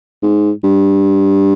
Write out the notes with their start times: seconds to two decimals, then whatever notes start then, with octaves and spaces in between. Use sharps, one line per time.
0.22 G#2
0.64 G2